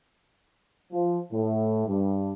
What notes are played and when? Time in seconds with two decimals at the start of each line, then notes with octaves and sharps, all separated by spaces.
0.92 F3
1.31 A2
1.87 G2